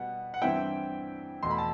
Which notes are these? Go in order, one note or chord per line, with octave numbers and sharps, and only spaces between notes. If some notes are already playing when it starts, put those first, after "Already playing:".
Already playing: B2 G3 B3 F#5
F#5
G2 E3 G3 C4 E4 E5 G5
E2 B2 A3 C6
B5
A5